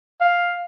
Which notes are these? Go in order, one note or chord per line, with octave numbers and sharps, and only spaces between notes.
F5